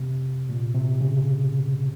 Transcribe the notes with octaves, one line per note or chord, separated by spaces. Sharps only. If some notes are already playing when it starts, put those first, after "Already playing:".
Already playing: C3
A#2
C3
C#3